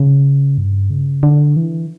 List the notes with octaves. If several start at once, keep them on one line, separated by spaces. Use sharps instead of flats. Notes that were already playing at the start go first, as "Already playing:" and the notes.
Already playing: C#3
G2
C#3
D3
E3